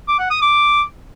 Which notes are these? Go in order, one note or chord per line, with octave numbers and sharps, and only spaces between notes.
D6
F#5
D#6
D6